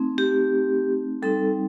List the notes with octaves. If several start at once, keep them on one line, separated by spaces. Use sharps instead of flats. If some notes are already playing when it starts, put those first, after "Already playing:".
Already playing: A3 C4 D#4
G4
G3 C4 D#4 A4